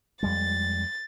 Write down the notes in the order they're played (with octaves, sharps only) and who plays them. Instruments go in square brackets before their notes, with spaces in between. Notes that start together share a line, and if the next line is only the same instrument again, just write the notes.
[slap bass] F2 G3 G#3 [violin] A6